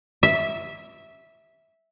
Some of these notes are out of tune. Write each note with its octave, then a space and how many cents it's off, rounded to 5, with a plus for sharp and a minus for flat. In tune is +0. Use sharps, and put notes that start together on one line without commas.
E5 -10